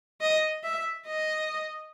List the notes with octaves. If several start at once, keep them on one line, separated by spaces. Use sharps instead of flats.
D#5
E5
D#5